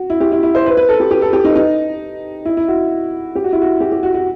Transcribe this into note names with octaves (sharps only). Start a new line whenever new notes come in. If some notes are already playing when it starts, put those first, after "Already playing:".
Already playing: F#4
E4
G4
E4
E4
C5
B4
B4
A4
G4
G4
A4
G4
D#4
D#4
E4
E4
F#4
G4
F#4
E4
F#4
G4
G4
F#4
F#4